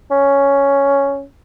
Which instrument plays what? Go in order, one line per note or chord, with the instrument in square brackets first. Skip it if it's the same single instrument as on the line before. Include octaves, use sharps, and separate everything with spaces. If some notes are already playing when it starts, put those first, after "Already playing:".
[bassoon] C#4